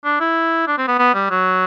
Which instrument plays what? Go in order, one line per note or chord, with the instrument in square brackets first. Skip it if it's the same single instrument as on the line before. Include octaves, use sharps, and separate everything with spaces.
[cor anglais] D4
E4
D4
C4
B3
B3
G3
F#3